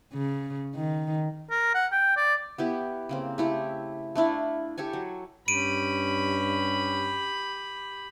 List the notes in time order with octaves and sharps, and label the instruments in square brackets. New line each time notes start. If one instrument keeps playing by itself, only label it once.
[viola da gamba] C#3
D#3
[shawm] A#4
F#5
G5
D5
[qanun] B3 E4 G4
C#3 A#3 C4
A3 E4 G4
A3 D4 E4 F5
G4 A4 C#5 G#5
F#3
[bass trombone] G2 [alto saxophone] C#4 [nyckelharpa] G4 B5 [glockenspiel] D7 D#7